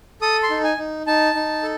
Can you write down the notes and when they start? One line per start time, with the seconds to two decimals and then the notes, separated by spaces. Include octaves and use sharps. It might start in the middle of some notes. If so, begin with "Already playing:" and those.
0.21 A4 D#6
0.43 C6
0.50 D#4
0.64 G#5
0.78 D#4
1.07 D#4 A5
1.35 D#4
1.63 A4